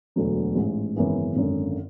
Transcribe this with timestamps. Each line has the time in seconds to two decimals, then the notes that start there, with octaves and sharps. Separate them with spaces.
0.16 E1 D2 D3 F#3
0.55 A1 G#2 G#3
0.96 G#1 F#2 C#3 E3 B3
1.36 G#1 F#2 D3